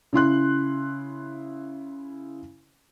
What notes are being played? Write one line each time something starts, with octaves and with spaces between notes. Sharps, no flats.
C#3 E4 C6 F#6